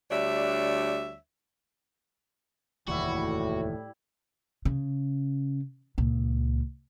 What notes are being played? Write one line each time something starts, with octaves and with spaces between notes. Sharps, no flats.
D2 G3 D4 C#5 E5
F1 D#2 A2 E3 G3 E4 F#4
C#3
C#2 A#2